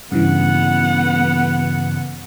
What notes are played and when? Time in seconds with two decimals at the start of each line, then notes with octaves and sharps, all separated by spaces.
0.12 G2 C#3 E3 B3 F#5